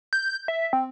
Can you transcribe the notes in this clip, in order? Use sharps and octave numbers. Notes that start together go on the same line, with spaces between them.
G6
E5
C4